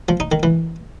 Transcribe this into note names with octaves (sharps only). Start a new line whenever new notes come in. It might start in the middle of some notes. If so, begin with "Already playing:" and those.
F3
D#4
D#3
E3